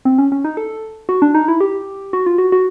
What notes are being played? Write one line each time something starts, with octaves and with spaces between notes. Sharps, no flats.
C4
C#4
C#4
D#4
A4
F#4
D4
D#4
E4
G4
F#4
F4
F#4
F#4